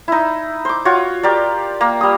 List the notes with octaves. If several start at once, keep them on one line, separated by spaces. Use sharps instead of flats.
D#4 E4
C5 D6
F4 F#4 C#5
G4 A#4 D5
A#3
G3 D#6